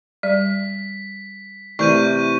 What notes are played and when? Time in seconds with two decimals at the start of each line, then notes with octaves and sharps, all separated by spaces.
0.23 G3 D5 B6
1.79 C3 E3 A3 A#4 D5 C#6 G6 D#7